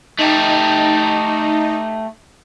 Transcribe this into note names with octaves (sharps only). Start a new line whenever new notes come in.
A3 D#4 G4